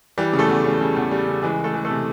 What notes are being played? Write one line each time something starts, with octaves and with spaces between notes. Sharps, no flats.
E3 G3 G4
C#3
A3 A4
E2
C#3
C#3
E2
G3
C#3
E3 G#3 G#4
E3
A3 A4
E3
A3 A4
C3